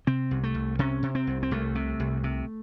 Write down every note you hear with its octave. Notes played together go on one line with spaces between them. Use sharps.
C3 C4
C2
A3
C2
C3 C#4
C3
C4
C2
C4
C2 A3
C3
C2
C3